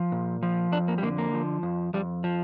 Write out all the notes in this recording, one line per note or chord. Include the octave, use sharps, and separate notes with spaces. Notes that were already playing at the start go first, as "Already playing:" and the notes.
Already playing: F3
A#2
F3
F2 D4
A#3
G3
D3 A#3
A#3
F3
F2
F2 G3
F3